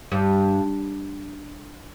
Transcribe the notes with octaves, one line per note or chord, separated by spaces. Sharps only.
G2